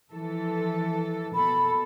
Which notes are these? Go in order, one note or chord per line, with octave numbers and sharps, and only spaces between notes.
E3 F3 A4
B2 A4 B5